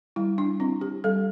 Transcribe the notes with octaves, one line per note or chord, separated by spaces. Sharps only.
G3 E4
D4
C4 E4
G4
G3 A4